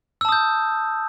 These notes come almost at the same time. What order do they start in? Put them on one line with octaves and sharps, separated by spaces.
E6 A5 D#6 G6